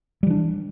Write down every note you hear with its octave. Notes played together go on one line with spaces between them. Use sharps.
E3 G3 D4